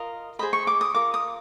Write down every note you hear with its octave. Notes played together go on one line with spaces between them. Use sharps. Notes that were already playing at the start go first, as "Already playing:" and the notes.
Already playing: F4 A#4 D#5
G#4 C5 D#5 B5
C#6
D6
D#6
F4 A#4 D6
D#6